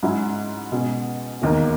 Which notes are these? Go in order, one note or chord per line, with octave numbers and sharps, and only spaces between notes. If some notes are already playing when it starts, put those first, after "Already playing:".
G#2 F#3 C#4 E4
B2 G#3 C#4
E1 D#2 D#3 A#3